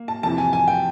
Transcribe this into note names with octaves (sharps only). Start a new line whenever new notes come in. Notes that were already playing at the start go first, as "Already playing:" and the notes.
Already playing: A#3
A5
F2 C3 E3 A5
G#5
G#5
G5